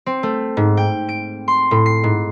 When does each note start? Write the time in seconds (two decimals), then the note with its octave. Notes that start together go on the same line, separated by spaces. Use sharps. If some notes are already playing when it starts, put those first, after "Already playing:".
0.06 C4
0.23 A3
0.57 G#2
0.77 G5
1.09 D7
1.48 C6
1.71 A2
1.86 C7
2.03 G#2